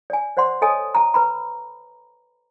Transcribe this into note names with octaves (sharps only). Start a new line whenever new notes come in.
D5 G#5
C5 D5 F#5 C6
A4 C#5 D#5 G#5 A5 D#6
A5 A#5
B4 A#5 B5